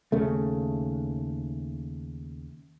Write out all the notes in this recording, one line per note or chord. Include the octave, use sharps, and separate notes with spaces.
D#2 C#3 A3